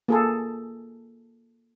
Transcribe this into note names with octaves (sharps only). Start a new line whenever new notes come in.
A#3 G#4 A4